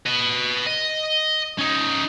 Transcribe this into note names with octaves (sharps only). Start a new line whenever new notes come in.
B4 D#5
D#5
C#4 D#4